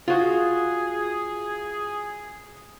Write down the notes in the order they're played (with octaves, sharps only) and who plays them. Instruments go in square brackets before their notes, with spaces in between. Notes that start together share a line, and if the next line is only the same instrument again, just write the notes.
[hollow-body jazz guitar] F4 F#4 [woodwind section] G#4